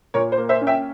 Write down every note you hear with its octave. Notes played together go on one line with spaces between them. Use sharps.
A#2 A#4 C#5
C5
A#3
C5 E5
C#4
E5 G5